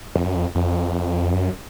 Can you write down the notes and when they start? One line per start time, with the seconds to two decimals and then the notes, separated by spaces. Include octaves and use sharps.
0.16 F2
0.26 F#2
0.35 F2
0.55 F2
1.33 F#2